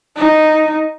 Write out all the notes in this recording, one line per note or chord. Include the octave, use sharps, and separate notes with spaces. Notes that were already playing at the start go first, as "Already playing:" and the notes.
D#4